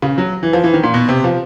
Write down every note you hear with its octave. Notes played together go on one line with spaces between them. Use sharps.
C#3
F#3
E3
F3
E3
D#3
A#2
B2
C3
F3